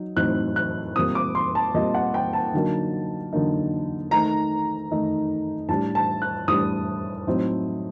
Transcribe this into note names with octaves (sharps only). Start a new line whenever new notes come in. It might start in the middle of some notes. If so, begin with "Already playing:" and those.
Already playing: F#3 D#4
A2 F#3 C4 D#4 F#6
F#6
A#2 G3 C4 D#6
D6
C6
A5
A#2 G3 C4 D#5
F#5
G5
A5
D3 F#3 A#3 D#4
D3 F#3 A#3 D#4
D#3 A3 D#4 A#5
D#3 A3 D#4
A2 G3 D4 A5
A5
F#6
A2 G3 D4 D#6
A2 F#3 C4 D#4